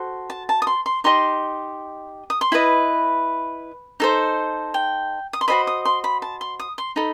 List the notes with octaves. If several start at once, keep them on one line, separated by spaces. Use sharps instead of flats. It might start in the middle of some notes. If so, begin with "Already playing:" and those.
Already playing: F#4 A4 C5
A5
A5
D#6
C6
C6
D#4 G4 D#5 C6
D#6
C6
E4 B4 D#5 B5
D#4 A4 C5
G5
D#6
C6
F#4 A4 C5 D#5 B5
D#6
C6
B5
A5
C6
D#6
C6
D#4 A4 B5